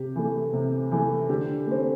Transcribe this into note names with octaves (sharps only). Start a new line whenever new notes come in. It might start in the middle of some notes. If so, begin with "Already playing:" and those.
Already playing: C3 G4
E3 A3
C3
E3 A3
D3 G4
A3 C4